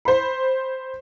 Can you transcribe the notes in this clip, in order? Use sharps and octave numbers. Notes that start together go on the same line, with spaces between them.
C5 B5